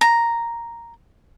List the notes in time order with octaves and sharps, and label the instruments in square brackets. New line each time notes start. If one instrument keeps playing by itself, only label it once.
[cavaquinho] A#5